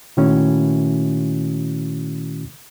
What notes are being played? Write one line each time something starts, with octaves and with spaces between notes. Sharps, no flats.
A#2 D#3 A3 C#4 E4 F#4